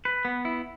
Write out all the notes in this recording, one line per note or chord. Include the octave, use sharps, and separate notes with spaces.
B4
B3
E4